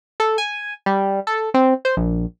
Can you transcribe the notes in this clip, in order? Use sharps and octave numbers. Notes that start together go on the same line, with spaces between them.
A4
G#5
G3
A4
C4
C5
A#1